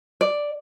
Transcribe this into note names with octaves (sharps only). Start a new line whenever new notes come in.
D5